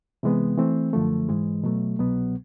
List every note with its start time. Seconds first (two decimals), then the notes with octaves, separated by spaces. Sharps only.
0.23 C3 E3 G#3 B3
0.58 E3 A3 C4
0.93 F#2 D3 F3 A3
1.29 G#2 E3 G#3
1.64 B2 F#3 A3
1.99 C2 B2 F#3 B3